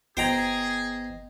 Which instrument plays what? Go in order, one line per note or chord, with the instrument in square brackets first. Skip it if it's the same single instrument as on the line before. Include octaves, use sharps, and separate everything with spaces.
[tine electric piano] G1 B3 D#5 [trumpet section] G#4 [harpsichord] C5 G5 A#5